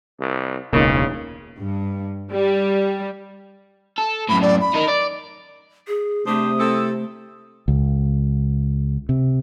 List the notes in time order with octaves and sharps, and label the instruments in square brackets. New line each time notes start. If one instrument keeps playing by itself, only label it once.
[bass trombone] C2
[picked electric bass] E1 C#2 [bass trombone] C#3 [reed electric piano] A#3 C#4 D#4
[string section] G2
G3
[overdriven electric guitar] A4
[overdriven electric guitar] F#2 A2 [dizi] B5
[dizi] D5
B5
[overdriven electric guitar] D#4 A#4
D5
[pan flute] G#4
[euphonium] C3 [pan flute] A3 [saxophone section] D4 G4 C5 [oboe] D#6
[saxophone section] C4 E4 A4
[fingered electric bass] C#2
C3